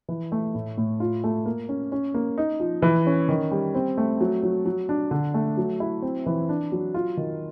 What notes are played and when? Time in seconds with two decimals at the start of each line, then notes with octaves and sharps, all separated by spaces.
0.09 E3
0.32 A3
0.55 A2
0.77 A2
1.00 F4
1.24 A3
1.46 A#3
1.69 C#4
1.92 C#4
2.14 A#3
2.38 D#4
2.60 F3
2.82 E3
3.06 C#4
3.29 D#3
3.51 G3
3.75 C4
3.98 A3
4.21 F#3
4.43 F#3
4.66 F#3
4.89 D4
5.11 D3
5.34 A3
5.57 F#3
5.80 E4
6.02 C4
6.26 E3
6.49 D4
6.72 F#3
6.94 F4
7.17 D#3